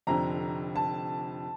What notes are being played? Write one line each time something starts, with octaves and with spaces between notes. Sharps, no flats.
F1 F2 D3 A#5
A5